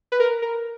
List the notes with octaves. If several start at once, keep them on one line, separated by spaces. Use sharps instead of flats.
B4
A#4
A#4